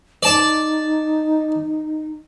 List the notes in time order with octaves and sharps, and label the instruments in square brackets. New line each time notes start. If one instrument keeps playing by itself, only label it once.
[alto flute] D#4 [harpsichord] D5 A5 D6